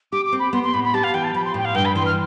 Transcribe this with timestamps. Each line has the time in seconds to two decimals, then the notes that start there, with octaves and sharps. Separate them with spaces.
0.12 G4 D6
0.25 D6
0.32 C4
0.39 B5
0.53 B3 C6
0.63 C6
0.73 A2 B5
0.84 B5
0.94 G4 A5
1.03 F5
1.14 E3 G5
1.24 A5
1.34 F3 B5
1.45 C6
1.54 A2 G5
1.65 F5
1.75 G2 G5
1.85 B5
1.96 E3 C6
2.05 F6